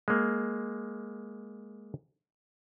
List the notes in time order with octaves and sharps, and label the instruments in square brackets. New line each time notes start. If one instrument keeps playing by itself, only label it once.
[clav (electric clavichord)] G#3 A#3